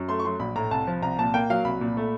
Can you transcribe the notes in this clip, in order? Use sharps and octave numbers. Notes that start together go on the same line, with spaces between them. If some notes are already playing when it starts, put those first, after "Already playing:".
Already playing: F#2
A3 C6
C#6
F#3 C6
A#1 B5
A2 A#5
C2 A5
F3
C2 A#5
A#2 A5
A#3 G5
F#3 F5
C2 B5
A#2
A3